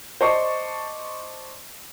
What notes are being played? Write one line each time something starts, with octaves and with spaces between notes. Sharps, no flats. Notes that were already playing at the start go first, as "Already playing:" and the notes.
C5 D5 D#5 A5 C6 C#6